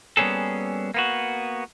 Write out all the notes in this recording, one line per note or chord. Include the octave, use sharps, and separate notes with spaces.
G3 A#3 B3 C#4 G#4 A4
A#3 B3 F#4